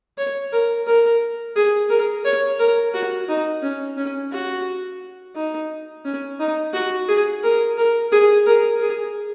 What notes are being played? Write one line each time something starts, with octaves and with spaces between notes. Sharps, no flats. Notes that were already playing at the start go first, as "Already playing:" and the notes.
C#5
A#4
A#4
G#4
A#4
C#5
A#4
F#4
D#4
C#4
C#4
F#4
D#4
C#4
D#4
F#4
G#4
A#4
A#4
G#4
A#4
G#4